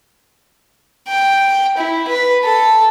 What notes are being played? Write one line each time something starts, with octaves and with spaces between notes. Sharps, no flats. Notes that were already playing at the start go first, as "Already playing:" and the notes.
G5
E4
B4
A4